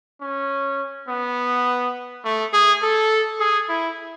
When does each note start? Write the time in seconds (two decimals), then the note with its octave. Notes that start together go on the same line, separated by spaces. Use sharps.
0.21 C#4
1.08 B3
2.25 A3
2.53 G#4
2.82 A4
3.40 G#4
3.69 E4